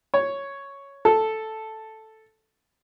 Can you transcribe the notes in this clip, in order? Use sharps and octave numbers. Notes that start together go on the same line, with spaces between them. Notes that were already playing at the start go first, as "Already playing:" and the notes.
C#5
A4